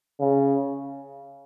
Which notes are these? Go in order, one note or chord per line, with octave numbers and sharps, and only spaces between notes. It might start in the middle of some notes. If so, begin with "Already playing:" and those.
C#3